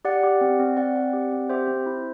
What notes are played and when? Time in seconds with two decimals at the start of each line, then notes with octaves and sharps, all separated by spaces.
0.05 G4 D5 F#5
0.23 G4
0.41 C4
0.59 C4
0.77 C4 D5 F#5
0.96 C4
1.13 G4
1.32 C4
1.49 G4 C5 E5
1.68 C4
1.86 E4